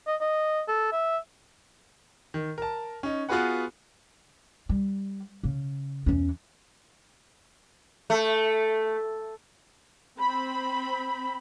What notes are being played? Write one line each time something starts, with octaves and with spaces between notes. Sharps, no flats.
D#5
D#5
A4
E5
D#3
A#4 A5
C#4 D#4
B3 F4 F#4 G#4 B4 F#5
G3
C#3
E2 C#4
A3
C4 B5